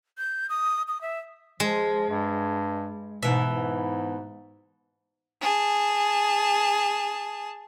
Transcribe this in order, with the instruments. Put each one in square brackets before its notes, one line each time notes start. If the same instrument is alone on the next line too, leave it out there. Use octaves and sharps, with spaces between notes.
[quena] G6
D#6
D#6
E5
[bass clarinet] F3 [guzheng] G#3
[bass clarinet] G2
[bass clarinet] G#2 [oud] B2 E3 [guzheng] E5
[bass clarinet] G#2
[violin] G#4 A5